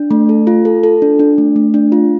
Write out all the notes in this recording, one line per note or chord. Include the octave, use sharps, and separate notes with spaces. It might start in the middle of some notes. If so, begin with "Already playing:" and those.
Already playing: D4
A3
A4
F4
A4
A4
D4
D4
A3
A3
D4
F4